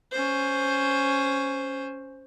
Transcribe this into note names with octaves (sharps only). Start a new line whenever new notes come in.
C#4 C5